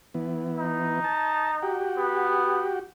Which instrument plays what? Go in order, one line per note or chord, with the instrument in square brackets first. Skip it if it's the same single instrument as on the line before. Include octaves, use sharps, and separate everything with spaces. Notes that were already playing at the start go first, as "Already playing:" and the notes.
[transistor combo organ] E3 B3
[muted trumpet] D#4
[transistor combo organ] A5
F#4 G4
[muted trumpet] B3